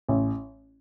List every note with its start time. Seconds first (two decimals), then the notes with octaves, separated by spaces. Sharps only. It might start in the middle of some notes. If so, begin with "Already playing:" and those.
0.09 A1